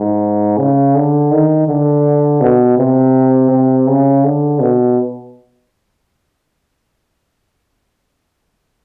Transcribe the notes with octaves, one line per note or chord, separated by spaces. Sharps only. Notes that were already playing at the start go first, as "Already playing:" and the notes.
Already playing: G#2
C#3
D3
D#3
D3
B2
C3
C3
C#3
D3
B2